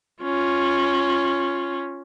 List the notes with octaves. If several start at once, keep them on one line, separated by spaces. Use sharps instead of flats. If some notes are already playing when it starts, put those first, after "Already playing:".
C#4 F4